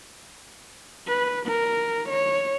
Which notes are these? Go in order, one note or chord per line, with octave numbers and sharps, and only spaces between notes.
B4
A#4
C#5